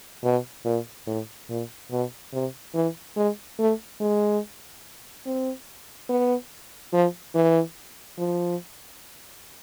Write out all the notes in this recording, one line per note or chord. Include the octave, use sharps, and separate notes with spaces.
B2
A#2
A2
A#2
B2
C3
E3
G#3
A3
G#3
C4
B3
F3
E3
F3